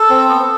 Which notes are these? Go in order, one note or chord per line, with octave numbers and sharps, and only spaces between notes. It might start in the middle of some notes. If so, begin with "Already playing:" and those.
Already playing: A4
C4
B3